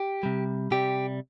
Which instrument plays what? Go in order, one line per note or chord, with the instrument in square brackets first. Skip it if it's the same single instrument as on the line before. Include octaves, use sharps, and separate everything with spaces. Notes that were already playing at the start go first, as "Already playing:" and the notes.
Already playing: [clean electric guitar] G4
C3 G3
C3 G3 G4